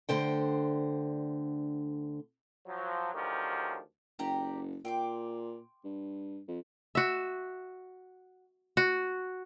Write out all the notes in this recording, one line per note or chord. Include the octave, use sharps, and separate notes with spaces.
D2 D3 C5 G5
F3 F#3
D2 D#3 F3 F#3 G4
F#1 G4 D5 A#5
A#2 G5 C6 D6
G2
F2
F#4 E5
F#4